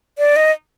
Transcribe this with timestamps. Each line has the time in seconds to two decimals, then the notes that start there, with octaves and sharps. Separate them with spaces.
0.18 D5
0.36 D#5